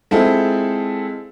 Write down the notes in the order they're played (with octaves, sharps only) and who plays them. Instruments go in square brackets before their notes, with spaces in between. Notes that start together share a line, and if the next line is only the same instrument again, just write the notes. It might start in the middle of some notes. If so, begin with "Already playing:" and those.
[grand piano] G#3 C4 E4 F4 A4